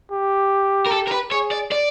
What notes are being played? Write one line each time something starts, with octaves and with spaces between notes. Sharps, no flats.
G4
A#4
A4
A#4
B4
G#4 C#5
D5
D5